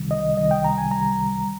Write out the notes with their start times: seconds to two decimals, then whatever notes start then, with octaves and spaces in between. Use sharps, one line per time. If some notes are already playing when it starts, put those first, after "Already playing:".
Already playing: C2 C3 D#3 G3
0.11 D#5
0.37 C2 C3 D#3 G3 D#5
0.51 G5
0.64 A#5
0.78 G#5
0.91 C2 C3 D#3 G3 A#5